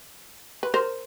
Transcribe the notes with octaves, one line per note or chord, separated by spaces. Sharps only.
B4
A#4 C5